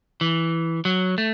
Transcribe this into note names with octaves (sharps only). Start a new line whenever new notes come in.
E3
F#3
A3